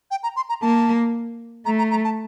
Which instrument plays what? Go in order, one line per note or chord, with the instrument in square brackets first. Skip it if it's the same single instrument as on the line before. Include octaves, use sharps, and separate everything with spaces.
[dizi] G5
A#5
C6
A#5
[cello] A#3 [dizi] A5
[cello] A3 [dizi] A#5
[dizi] A#5
A#5
A5